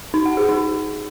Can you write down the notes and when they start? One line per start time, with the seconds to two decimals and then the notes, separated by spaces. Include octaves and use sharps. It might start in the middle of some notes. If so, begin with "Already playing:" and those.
0.14 D#4
0.25 F#5
0.37 G#4
0.49 D#4